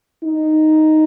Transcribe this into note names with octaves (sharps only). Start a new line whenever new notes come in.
D#4